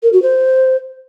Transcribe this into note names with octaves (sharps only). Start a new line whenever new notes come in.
A#4
F#4
C5